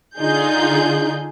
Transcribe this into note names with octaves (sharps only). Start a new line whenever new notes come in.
D3 D#4 F4 G#4 G6